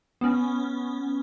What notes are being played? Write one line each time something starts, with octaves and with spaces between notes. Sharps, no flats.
B3 C#4